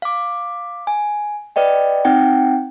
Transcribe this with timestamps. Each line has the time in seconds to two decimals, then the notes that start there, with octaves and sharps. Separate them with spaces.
0.02 F5 D6
0.87 G#5
1.56 B4 D5 D#5 G5
2.05 C4 D#4 F#5 G5